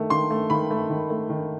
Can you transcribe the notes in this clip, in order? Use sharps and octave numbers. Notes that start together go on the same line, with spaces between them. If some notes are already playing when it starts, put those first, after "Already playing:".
Already playing: D#3 A3
D#3 C6
A3
D#3 B5
A3
D#3
A3
D#3